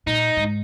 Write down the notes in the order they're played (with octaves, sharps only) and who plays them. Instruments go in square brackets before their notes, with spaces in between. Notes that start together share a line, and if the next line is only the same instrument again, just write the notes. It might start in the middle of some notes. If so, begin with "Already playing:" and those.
[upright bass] A#2 [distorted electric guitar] D#4
[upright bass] G#2